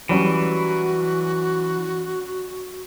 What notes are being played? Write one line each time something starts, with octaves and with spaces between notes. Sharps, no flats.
E3 F#3 G3 C#4 F#4